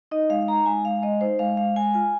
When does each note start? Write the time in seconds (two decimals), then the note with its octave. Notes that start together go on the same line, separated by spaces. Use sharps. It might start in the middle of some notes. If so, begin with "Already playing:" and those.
0.11 D#4 D#5
0.30 G#3 F5
0.48 D#4 A#5
0.66 G#3 G#5
0.84 G#3 F5
1.02 G#3 D#5
1.21 D#4 C5
1.39 G#3 F5
1.57 G#3 F5
1.76 G#3 G#5
1.94 F4 G#5